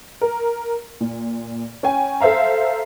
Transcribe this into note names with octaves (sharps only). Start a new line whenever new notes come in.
A#4
A#2
C#4 G5 G#5
A4 C5 E5 F5 A#5